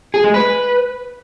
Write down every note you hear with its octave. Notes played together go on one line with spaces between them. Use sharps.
G#4
G#3
B4